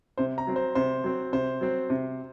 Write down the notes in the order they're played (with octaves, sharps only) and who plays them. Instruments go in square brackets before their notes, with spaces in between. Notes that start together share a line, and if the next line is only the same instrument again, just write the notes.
[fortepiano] C3 [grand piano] C5
[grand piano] A#5
[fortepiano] F#3 C4
[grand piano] C5
[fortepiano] C3 [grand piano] C5
[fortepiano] F#3 C4
[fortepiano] C3 [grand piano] C5
[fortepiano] F#3 C4
C3